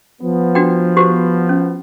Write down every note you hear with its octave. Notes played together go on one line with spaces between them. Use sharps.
F3 B3
D4 F#4 G5
F#4 G4 C5
C#4